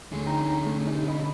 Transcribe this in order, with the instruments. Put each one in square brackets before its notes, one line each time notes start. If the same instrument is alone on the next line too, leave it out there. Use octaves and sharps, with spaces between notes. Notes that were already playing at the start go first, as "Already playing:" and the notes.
[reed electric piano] D2 A3 [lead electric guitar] D3 G#4
[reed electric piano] D#4 G5 A#5
A3
D#4 G4
D#5 B5